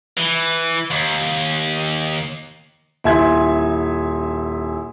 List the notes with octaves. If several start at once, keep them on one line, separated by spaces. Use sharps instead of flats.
E3
D#2
D#1 E4 E5 G#5 C6 G#6